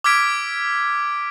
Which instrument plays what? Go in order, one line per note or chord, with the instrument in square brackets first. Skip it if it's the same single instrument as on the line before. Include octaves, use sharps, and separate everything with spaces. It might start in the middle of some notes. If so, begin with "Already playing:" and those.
[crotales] D6 E6 F6 G#6 B6 D7